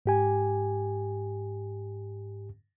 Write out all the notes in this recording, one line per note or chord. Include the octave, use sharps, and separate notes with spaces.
G#2 G4 G#5